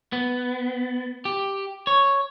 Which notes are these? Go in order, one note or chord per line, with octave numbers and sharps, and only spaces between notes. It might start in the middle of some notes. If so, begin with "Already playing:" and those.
B3
G4
C#5